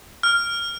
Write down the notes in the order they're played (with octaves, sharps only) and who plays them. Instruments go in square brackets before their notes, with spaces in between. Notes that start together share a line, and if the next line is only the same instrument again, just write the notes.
[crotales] F6